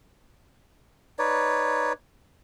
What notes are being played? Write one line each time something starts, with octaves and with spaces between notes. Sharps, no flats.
D#4 B4 C#5 D5